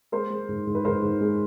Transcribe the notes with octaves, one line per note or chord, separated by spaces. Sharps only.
G#3 A#4 C5
G#3
G#2
G#2
B4
G#2 A#4 C5
G#2
G#3